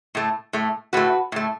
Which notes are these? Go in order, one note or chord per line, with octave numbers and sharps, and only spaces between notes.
A2 A3
A2 A3
A2 A3 F#4 B4
A2 A3